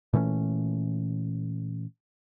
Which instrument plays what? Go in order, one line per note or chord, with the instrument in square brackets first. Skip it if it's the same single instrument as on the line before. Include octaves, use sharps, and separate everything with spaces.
[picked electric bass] A#2 E3 A3 C#4